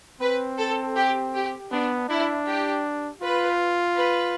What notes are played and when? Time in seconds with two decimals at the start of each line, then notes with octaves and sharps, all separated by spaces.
0.21 C4 B4
0.58 A4
0.96 G4
1.34 G4
1.71 B3 D4
2.09 D4 E4
2.47 G4
3.22 F4 B4
3.98 B4